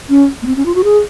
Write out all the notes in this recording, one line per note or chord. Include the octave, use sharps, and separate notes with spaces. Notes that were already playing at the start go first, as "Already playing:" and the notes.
C#4
A#3
C4
C#4
F4
F#4
G#4